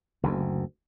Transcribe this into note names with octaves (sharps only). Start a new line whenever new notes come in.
F#1 D2